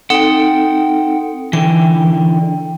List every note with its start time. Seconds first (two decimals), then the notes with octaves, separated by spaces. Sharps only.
0.10 C4 D#4 A4 F#5 G5
1.53 D3 E3 G5